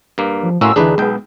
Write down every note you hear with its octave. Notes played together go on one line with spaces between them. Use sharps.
G2 A#3
F3
A2 A#3 C#4 F#4 A#5 C6 E6
D2 D3 E3 D4 D#4 G#4 B4
B1 G#3 B3 G5